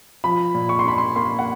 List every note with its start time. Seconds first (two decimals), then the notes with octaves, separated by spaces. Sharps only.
0.24 F3 B5
0.55 A#2
0.69 C#6
0.79 C6
0.85 D4 B5
0.98 C6
1.16 A#3 C6
1.39 F#5